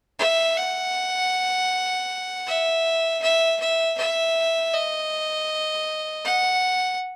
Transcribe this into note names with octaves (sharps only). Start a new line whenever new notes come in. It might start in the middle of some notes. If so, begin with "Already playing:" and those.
E5
F#5
E5
E5
E5
E5
D#5
F#5